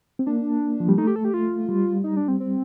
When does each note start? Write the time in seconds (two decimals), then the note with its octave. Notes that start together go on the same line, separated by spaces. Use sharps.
0.19 C4
0.26 A#3 D4
0.80 F3
0.89 G3
0.98 A3 D#4
1.07 G4
1.16 A4
1.25 G4
1.34 F4
1.69 G3
2.04 D#4
2.17 D4
2.28 C4
2.40 C4